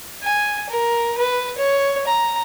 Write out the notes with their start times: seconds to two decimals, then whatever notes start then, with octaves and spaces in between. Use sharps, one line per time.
0.23 G#5
0.69 A#4
1.18 B4
1.58 C#5
2.07 A#5